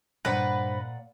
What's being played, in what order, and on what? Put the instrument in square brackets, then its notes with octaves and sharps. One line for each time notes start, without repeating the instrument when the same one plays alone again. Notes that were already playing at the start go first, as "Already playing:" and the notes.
[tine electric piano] G2 C5 A#6 [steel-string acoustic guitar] A#2 D5 F#5 [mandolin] B4